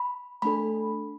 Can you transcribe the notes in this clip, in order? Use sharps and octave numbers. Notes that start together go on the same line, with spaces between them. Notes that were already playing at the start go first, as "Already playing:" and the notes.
Already playing: B5
A3 D4 A4 B5